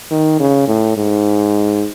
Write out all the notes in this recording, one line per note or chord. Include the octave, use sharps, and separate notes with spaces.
D#3
C#3
A2
G#2